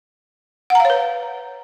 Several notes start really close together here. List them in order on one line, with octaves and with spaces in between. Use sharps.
F#5 A#5 F5 C#5 B4